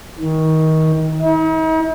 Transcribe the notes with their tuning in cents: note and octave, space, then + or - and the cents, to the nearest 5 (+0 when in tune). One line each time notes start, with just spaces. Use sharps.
D#3 +25
D#4 +45